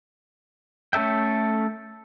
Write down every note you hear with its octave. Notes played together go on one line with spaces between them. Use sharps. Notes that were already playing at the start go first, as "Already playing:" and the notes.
A3 C#4 A4 E5 G5